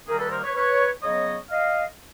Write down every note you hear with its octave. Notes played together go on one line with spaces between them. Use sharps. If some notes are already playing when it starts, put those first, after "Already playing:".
D#2 D#3 G3 A#3 D#4 G#4 A#4
A4 B4
A#4 C5
B4 C#5
B4 C#5
C#3 F#3 B3 C#5 D#5
D#5 F5